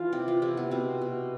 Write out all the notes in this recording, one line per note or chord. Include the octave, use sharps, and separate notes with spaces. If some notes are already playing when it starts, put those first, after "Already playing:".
Already playing: E3 F4
C3 G4
F4
C3 E4
B3
B2 C4
B2